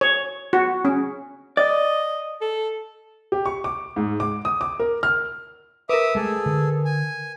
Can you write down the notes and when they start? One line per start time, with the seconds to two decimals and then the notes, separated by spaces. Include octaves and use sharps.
0.01 C#5
0.53 F#4
0.85 C#4
1.57 D5 D#5
2.41 A4
3.32 G4
3.46 C#6
3.64 D6
3.96 G#2
4.20 D6
4.45 D#6
4.61 D6
4.80 A#4
5.03 F6
5.89 A#4 B4 E5 D6 D#6
6.15 G#3 A3 G#4 A4
6.46 D3
6.85 G#5